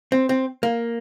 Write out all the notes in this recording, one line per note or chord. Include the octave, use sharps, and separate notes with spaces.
C4
C4
A#3